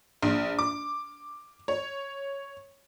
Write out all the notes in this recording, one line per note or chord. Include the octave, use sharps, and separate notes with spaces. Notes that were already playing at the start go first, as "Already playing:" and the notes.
A#1
D6
C#5